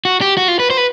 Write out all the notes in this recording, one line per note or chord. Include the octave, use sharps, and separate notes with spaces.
F#4
G4
F#4
F4
B4
C5
B4